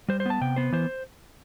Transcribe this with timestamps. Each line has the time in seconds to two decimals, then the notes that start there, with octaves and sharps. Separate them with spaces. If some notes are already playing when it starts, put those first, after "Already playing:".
0.09 G3 C5
0.20 C5
0.26 B3 A5
0.41 C3 G5
0.56 B3 C5
0.72 E3 C5